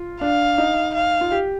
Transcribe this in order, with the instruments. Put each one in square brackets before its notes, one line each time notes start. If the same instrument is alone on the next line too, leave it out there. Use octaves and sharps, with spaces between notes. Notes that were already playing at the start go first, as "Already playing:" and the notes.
Already playing: [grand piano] F4
[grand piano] D4 [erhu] F5
[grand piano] D#4
[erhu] F5
[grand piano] F4
G4